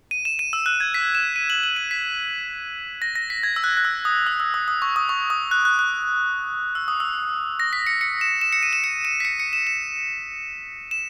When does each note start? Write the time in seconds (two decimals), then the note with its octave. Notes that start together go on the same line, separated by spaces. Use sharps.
0.11 D#7
0.25 E7
0.39 D#7
0.53 E6
0.66 F#6
0.80 G#6
0.94 B6
1.15 E7
1.36 D#7
1.50 F#7
1.63 F#7
1.77 D#7
1.91 B6
3.02 A#6
3.15 A#6
3.30 B6
3.43 G#6
3.56 E6
3.64 F#6
3.77 F#6
3.85 E6
4.05 D#6
4.27 E6
4.40 E6
4.54 D#6
4.68 D#6
4.82 C#6
4.96 D#6
5.09 C#6
5.30 D#6
5.51 F#6
5.65 F#6
5.79 F#6
6.75 E6
6.88 D#6
7.00 E6
7.60 A#6
7.73 B6
7.87 C#7
8.01 C#7
8.21 E7
8.41 E7
8.53 C#7
8.63 D#7
8.73 E7
8.84 C#7
9.05 D#7
9.20 B6
9.25 C#7
9.40 C#7
9.53 E7
9.67 E7
10.91 E7